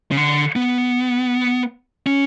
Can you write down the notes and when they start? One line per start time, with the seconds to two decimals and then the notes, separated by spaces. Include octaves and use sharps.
0.11 C#3
0.17 D3
0.56 B3
2.07 C#4